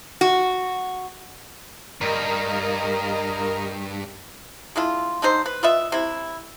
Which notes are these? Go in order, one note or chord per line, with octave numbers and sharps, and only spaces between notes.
F#4
G2 A#4 D#5 A#5
G#3 D4 E4 F4
D3 G3 D#4 C5
B4
F4 B4 D#5 E5
C3 E4